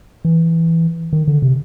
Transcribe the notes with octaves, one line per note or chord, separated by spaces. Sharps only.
E3
D#3
D3
C3